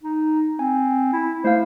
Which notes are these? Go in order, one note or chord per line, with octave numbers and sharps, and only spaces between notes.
D#4
C4 G#5
E4
A3 E4 C5 F5